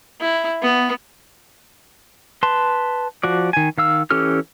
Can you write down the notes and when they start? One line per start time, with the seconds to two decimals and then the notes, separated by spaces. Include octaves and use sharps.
0.21 E4
0.62 B3
2.43 B4 A5 C6
3.23 F3 F#4 D5
3.53 D#3 G#5
3.78 D#3 F5 E6
4.11 E3 C#4 G4 A4 F6